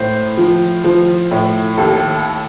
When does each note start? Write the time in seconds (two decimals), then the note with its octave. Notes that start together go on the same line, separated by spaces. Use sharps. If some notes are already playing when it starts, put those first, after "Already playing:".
Already playing: A2 C5
0.37 F3
0.84 F3
1.31 A2
1.78 D#2 A4